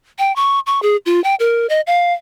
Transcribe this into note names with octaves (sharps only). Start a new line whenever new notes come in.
G5
C#6
C#6
G#4
F4
G5
A#4
D#5
F5